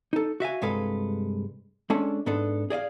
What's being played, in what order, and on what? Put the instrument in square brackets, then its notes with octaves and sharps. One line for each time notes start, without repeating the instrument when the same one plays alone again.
[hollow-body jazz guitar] D#4 A4
F#4 E5 F5 G#5
C2 G2 G#3 A4 B4 F5
G#3 C#4 D4 A4 A5
G#2 B3 D4 A4
G#4 D5 D#5 F5